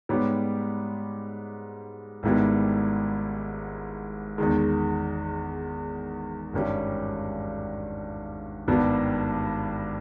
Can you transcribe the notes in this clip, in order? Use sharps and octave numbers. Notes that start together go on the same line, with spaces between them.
G#2 G3 B3 G4 C#5
G#1 G#2 G3 B3 E4
E2 D#3 G#3
G#1 G2 G3 C#4
G#1 G2 G3 B3 G4